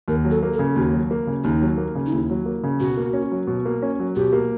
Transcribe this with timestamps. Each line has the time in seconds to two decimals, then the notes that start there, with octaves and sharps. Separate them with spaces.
0.08 D#2 A#4
0.25 F#3
0.31 A4
0.43 A#3
0.53 A4
0.59 C#3
0.76 D#2 F#4
0.93 F#3
1.11 A#3
1.27 C#3
1.44 D#2 D#4
1.62 F#3
1.78 A#3
1.95 C#3
2.06 D#4
2.12 D#2 E4
2.30 F#3
2.46 A#3
2.64 C#3
2.80 B2 F#4
2.97 A#3
3.13 C#4
3.32 F#3
3.47 B2
3.66 A#3
3.82 C#4
4.00 F#3
4.16 B2 G4
4.33 A#3